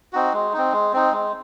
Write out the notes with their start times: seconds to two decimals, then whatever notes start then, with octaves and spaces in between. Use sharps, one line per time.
0.13 C4 D#4 F#4
0.33 G#3
0.53 C4 D#4
0.72 G#3
0.93 C4 D#4
1.12 G#3